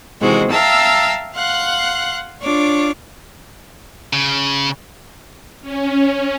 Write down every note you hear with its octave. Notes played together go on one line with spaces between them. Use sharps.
C3 D#3 E3 G#3 F#4 C5
E5 F5 G5 A5 A#5 E6
F5 F#5 C6 F#6
D4 F4 C#5 D6
C#3
C#4